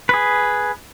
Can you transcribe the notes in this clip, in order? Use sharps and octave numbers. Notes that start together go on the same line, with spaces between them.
G#4 B4